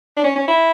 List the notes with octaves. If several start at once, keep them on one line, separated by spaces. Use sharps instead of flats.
D4
C#4
C#4
E4